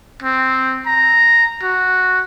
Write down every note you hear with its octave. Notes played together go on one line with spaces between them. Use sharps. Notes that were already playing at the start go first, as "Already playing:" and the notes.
C4
A#5
F#4